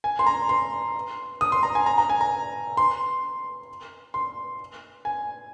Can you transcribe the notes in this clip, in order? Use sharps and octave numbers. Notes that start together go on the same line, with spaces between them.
G#5
C6
A#5
C6
D#6
C6
A#5
G#5
A#5
A#5
G#5
A#5
C6
C6
G#5